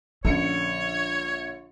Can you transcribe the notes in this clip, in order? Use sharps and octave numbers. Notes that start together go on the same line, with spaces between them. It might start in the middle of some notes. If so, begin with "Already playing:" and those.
A#1 D3 C#4 C#5 C#7